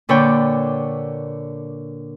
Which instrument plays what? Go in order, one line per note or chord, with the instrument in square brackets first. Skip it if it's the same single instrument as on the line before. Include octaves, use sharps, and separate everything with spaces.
[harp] A#2 D3 B4 C#5 D5 G5